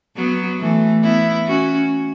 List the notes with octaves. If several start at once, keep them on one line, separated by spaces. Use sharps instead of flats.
F#3 B3
E3 A3
B3 E4
C#4 F#4